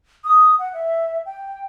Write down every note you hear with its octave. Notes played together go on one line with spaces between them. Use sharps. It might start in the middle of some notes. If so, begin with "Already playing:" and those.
D#6
F#5
E5
G5